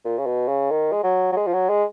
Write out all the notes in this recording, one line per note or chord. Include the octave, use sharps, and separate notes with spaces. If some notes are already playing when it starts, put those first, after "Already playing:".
A#2
C#3
B2
C#3
D#3
G#3
F#3
F#3
G#3
F3
F#3
G#3